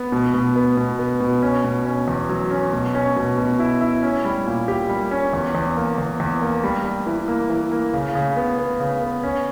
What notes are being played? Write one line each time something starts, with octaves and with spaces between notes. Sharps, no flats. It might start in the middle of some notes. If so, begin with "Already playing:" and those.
Already playing: B3
B2
B2
B3
B2
B3
B2
C#4
B2
C#4
E2
F#3
C#4
B2
C#4
B2
B2
E4
E4
C#4
G3
A#2
G4
G3
C#4
E2
E2
A#3
E2
E2
A#3
G3
G3
E3
A#3
E3
A#3
C#3
C#3
B3
B3
C#3
B3
C#4